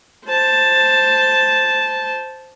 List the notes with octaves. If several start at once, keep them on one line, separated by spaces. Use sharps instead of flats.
C5 A5